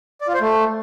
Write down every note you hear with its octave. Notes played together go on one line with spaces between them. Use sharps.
D5
F4
C5
A3